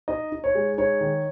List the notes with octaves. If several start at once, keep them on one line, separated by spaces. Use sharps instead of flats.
D#4 D#5
D#4
C#5
G#3
D#4 C#5
D#3